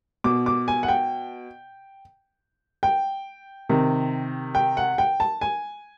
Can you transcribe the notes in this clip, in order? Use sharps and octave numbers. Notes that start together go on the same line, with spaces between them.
B2 D6
D6
G#5
F#5
G5
G5
C3 D#3
G5
F#5
G5
A5
G#5